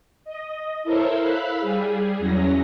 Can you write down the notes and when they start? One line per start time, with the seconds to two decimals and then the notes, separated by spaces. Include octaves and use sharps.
0.25 D#5
0.83 E4 A4 A#4 C5 C#5 E5
1.19 F5 B5 E6 F#6 B6
1.59 G3 G#4
2.19 E2 F#3 C#4 A#6